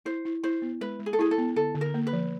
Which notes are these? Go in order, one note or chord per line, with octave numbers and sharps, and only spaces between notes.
E4 C5
E4
E4 C5
B3
G#3 B4
G#3
G#4
A4
E4 G#4
A4
B3
D3 A4
D3
A#4
A#3
B4
F3